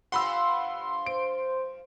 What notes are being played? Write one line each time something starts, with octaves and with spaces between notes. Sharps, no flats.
G2 F3 F4 F#5 B5 C6 E6
C5 D7